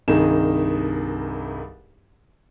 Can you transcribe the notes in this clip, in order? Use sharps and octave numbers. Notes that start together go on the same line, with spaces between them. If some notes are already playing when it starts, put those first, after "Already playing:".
C2 G2 D#3 D#4 G#4 E7